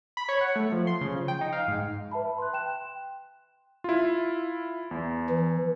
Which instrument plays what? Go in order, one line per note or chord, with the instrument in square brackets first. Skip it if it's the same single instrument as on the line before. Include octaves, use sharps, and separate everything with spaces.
[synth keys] B5
C#5
F#5
A3
F3
C6
C#3
F3
G5
D#4
F5
G#2
[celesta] B4 E5 A5 B5
C6 F#6
G5 F#6 E7
[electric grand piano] E4 F4
E2
[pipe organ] E3